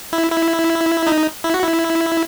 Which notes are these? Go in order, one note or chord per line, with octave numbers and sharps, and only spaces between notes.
E4
E4
D#4
E4
F#4
E4